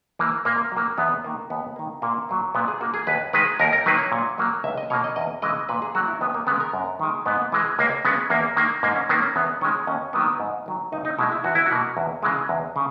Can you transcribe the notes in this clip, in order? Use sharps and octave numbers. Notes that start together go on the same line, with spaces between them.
E3 A#3
A#2 A#3
F#3 A#3
E2 B3
D#3 A#3
D#2 B3
D#3 A#3
A#2 A#3
F#3 A#3
A#2 B3
G#4
A#3 F#4
G#4
D#2 B4
D#3 G#3 B4
D#2 A#4
A#4
D#3 F#3 A#3 B4
C#5
A#2
F#3 A#3
C#2 E5
D#5
B2 A#3 C#5
D#5
E2 D#5
C#3 E3 G#3 D#5
A#2 B4
G#4
F#3 A#3 F#4
E4
D#2 B3
A#3
C#3 G#3 B3
A#4
F#2
D#3 G#3
G#2 B3
E3 G#3
C#2 A#3
C#3 G#3 B3
E2 A#3
D#3 A#3
G#2 A#3
C#4
D#3 A#3 B3
C#4
E2 B3
D#3 G#3 C#4
D#2 C#4
D#3 F#3 A#3 B3
G#2
D#3 F#3
C#2 D#4
D#4
B2 G#3 E4
E4
E2 F#4
E4
F#4
B2 A#3
E2
C#3 E3 G#3
E2
C#3